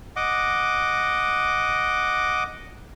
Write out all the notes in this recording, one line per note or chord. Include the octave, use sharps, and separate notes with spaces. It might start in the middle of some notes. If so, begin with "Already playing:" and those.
D#5 F#5 D6